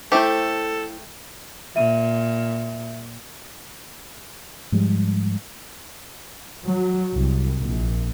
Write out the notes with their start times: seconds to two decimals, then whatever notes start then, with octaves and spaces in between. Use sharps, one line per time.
0.12 A3 E4 G4 A4 C5
1.76 A#2 E5 D#7
4.72 G#2 F3 G3 G#3
6.63 F#3
7.13 C2
7.59 A#1